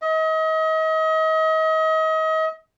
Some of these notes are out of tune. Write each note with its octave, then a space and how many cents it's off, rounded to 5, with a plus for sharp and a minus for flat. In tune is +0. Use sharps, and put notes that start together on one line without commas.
D#5 +35